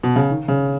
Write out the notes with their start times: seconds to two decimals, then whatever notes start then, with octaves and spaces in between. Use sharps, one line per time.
0.03 B2
0.16 C#3
0.30 D#3
0.48 C#3